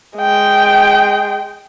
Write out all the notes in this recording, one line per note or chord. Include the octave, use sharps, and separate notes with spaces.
G#3 G5